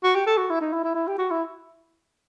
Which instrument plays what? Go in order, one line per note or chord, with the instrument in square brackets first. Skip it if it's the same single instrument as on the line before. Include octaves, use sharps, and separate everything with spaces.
[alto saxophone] F#4
G4
A4
F#4
E4
D#4
E4
E4
E4
G4
F#4
E4